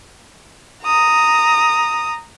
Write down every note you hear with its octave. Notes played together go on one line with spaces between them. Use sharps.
A#5 D#6